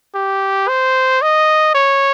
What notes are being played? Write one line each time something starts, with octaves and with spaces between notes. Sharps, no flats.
G4
C5
D#5
C#5